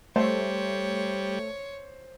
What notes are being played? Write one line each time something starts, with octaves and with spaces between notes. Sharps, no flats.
G3 A3 C5 C#5